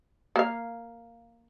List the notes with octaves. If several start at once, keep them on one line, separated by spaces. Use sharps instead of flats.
A#3 F5